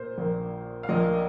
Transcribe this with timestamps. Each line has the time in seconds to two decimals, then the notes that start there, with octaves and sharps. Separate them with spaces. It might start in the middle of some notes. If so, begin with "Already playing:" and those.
Already playing: A#2 A#3 C5
0.18 A#1 A#2 A#3
0.83 F5
0.89 A#1 A#2 A#3 D#5